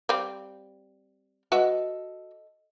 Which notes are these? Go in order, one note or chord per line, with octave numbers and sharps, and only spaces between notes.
G3 C4 F5
F#4 A4 B4 D#5 E5 A5